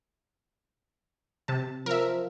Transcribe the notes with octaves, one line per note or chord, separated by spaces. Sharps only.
C3 A5
F3 A#4 E5